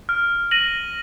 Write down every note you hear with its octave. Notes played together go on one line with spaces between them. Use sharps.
F6
A#6 D#7 F#7